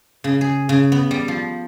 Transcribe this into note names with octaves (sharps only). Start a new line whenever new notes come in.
C#3
G#4
C#3
B3
G3
F3